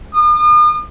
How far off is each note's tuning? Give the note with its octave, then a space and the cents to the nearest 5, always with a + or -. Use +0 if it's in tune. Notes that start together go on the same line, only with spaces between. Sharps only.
D#6 -40